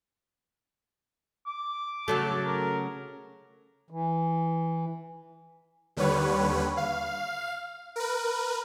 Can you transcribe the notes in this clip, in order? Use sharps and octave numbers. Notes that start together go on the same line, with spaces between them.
D6
C#3 F#3 A3 A5
A#4
E3
D#2 D3 G3 B4 C#5
F5
A#4 B4